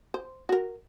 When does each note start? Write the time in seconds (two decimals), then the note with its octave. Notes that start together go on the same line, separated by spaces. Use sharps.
0.14 C5
0.49 F#4 A#4